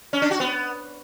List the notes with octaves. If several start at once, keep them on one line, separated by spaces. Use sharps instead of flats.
C#4
D4
F#4
B3